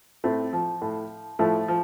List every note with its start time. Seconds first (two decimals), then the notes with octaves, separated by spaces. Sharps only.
0.24 A2 A3 C4
0.53 F3
0.81 A2
1.39 A2 F3 A3
1.68 F3